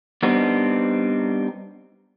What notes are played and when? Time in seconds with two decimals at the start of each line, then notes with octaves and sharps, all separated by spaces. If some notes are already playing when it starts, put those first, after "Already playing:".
0.23 G3 B3 C4 D4 D#4